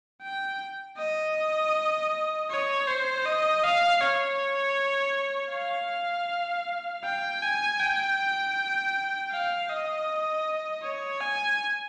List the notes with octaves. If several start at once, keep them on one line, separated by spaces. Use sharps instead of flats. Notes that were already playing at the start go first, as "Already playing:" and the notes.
G5
D#5
C#5
C5
D#5
F5
C#5
F5
G5
G#5
G5
F5
D#5
C#5
G#5